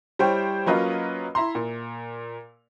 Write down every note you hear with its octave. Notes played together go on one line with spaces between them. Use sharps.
G3 E4 C5 C#5 G5
F#3 A#3 C#4 F4 B4 D#5
E4 E5 A#5 C6
A#2